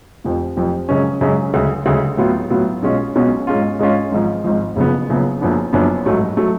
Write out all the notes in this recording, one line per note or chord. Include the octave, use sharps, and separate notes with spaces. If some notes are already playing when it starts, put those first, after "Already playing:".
F1 F2 F3
F1 F2 F3
F#2 C#3 G#3 C#4
F#2 C#3 G#3 C#4
D2 C#3 G#3
D2 C#3 G#3
A2 F#3 B3 F4
A2 F#3 B3 F4
B1 B2 G#3 C#4 F4
B1 B2 G#3 C#4 F4
G#2 G#3 C#4 F4
G#2 G#3 C#4 F4
G#1 G#2 F3
G#1 G#2 F3
F#1 F#2 C#3 F3 B3
F#1 F#2 C#3 F3 B3
F#1 F#2 F3 B3 D4
F#1 F#2 F3 B3 D4
A1 G#2 F#3 A3
F#3 A3